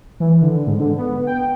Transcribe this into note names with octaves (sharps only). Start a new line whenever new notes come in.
E3
D3
G#2
D3
B3
G5